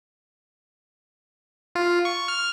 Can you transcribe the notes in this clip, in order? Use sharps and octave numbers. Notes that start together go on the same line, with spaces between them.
F4
C#6
F6